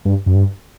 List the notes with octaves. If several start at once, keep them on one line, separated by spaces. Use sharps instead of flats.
G2
F#2
G2